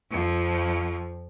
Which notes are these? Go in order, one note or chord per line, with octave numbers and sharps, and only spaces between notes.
F2 F3